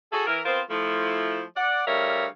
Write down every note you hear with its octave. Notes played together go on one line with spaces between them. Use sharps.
F#4 G#4 A4
E3 A#4
B3 C4 F4 A#4 C5
F3 A3 E4
D5 F#5
D2 G3 A#4 C#5 E5 F5